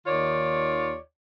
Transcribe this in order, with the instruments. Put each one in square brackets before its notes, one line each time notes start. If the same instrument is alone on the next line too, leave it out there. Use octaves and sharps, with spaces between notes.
[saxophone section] D#2 D#3 F4 C#5 D5